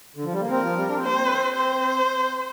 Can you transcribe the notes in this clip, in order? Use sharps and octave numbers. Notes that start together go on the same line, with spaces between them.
D3
F3
G3
A#3
C4 A#4
F3
G3
D4
C4
A#3 C5
C4
C5